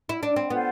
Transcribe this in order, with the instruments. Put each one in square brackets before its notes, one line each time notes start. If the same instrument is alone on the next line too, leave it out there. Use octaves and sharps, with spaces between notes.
[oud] E4
D4
C4
[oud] B3 [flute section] F4 A4 C5